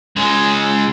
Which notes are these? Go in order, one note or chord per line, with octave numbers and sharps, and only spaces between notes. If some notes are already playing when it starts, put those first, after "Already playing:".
C#2 G#3